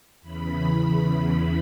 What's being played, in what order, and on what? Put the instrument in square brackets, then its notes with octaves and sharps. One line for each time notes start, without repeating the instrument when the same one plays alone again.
[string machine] E2 C#3 E3 B5